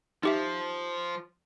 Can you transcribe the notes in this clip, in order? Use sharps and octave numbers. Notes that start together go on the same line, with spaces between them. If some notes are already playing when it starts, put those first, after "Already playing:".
F3 D#4 G4 E5